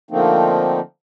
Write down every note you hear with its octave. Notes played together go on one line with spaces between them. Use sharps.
D3 F3 A3 A#3 C4 D#4